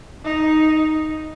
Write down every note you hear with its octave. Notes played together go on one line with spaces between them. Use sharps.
D#4